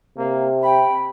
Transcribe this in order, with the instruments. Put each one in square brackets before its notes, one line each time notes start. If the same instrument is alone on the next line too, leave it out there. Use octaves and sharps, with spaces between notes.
[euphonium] C3 [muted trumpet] A#3
[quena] G5 [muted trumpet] B5